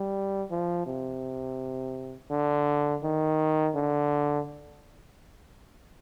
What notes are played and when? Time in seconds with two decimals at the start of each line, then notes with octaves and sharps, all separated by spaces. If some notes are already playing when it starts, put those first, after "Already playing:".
Already playing: G3
0.51 F3
0.87 C3
2.30 D3
3.03 D#3
3.75 D3